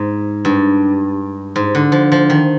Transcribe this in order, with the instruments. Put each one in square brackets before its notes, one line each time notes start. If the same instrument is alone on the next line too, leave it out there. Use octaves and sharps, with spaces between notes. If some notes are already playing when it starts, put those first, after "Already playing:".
Already playing: [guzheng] G#2
G2
G#2
D3
F3
F3
D#3